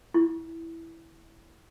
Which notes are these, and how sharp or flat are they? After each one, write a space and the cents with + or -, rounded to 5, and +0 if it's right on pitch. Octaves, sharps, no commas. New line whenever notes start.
E4 -5